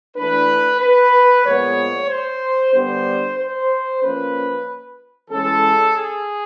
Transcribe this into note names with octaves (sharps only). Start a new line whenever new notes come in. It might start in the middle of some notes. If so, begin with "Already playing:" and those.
E3 A3 D4 B4
B4
A#2 F3 G#3 B3 C#5
C5
D3 G3 B3 D4 C5
C5
F3 A#3 C#4 B4
E3 G#3 C#4 A4
G#4